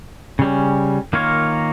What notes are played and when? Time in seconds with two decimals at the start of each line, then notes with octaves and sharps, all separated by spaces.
0.39 C#3 G3 C#4
1.13 D#3 A#3 F4 A#4 C#5